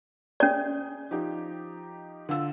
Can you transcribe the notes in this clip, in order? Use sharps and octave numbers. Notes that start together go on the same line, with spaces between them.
C#4 G#4 D5
F3 D#4 G4
D3 F4 E6